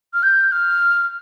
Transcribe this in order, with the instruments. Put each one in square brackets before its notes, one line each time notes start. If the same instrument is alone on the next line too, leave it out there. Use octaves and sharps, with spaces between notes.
[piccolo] F6
G6
F6